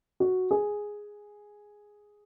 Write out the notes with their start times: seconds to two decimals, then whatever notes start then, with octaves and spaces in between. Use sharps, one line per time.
0.20 F#4
0.51 G#4